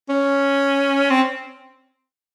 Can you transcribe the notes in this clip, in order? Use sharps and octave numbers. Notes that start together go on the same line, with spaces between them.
C#4
C4